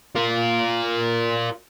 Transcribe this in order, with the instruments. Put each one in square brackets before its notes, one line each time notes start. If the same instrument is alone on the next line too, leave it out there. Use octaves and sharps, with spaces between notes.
[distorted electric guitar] F4 A#4